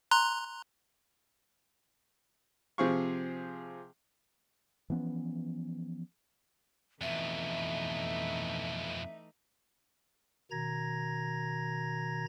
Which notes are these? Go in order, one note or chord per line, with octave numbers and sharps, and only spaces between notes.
A#5 C6 F#6
C3 F3 C4 G#4 F5 C#6
E3 F3 B3 C#4
F2 B2 E3 A3 D#4 E5
B2 D#3 A#5 G#6 A#6